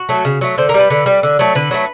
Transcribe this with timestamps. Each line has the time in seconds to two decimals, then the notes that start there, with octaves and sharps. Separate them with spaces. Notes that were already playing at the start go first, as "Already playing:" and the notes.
Already playing: F#4
0.09 F#3 A3
0.25 C#3
0.41 F#3 A3
0.58 D3 C5
0.69 A#4
0.74 G3
0.80 B4
0.90 D3
1.06 G3
1.23 D3
1.39 F#3 A3
1.55 D3 B4
1.71 F#3 A3